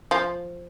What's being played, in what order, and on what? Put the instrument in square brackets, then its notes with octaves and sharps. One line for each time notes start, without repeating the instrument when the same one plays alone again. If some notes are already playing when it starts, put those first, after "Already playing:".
[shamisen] F3